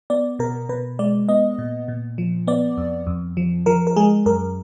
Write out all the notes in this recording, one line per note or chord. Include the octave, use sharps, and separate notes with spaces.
B3 D5
B2 A#4
B2 B4
G#3 D5
B3 D#5
A#2
A#2
F3
B3 D5
F2
F2
F3
F3 A#4
A#4
G#3 G#4
F#2 A#4